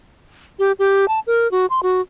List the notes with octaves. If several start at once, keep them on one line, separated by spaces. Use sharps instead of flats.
G4
G4
A5
A#4
F#4
C6
F#4